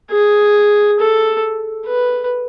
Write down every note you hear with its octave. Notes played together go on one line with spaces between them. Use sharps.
G#4
A4
B4